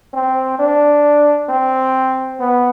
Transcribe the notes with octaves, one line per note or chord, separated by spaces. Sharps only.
C4
D4
C4
B3